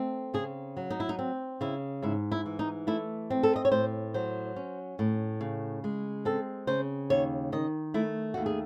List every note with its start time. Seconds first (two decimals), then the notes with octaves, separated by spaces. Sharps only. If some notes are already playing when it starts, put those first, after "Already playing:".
Already playing: A3 C4
0.34 C#3 G#4
0.77 F#3
0.90 D#4
1.00 E4
1.09 D#4
1.19 C4
1.61 C#3 E4
2.02 G#2 E4
2.32 E4
2.46 E3
2.59 D#4
2.87 A3 E4
3.30 C4
3.43 A4
3.56 D#5
3.65 C#5
3.72 A2 C5
4.14 F#3 C5
4.56 C#4
4.99 A2
5.41 C#3
5.84 G#3
6.25 C4 A4
6.67 C#3 C5
7.10 D#2 C#5
7.52 D#3 D#5
7.94 A3 E4
8.34 D#2 F#4
8.46 G#4